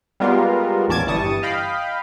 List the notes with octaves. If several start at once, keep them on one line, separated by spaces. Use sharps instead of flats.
G3 G#3 B3 F4 A#4
A#1 E2 C#4 A5 D6 G#6
G1 E3 G3 A5 C#6 D#6
D#5 F5 G5 B5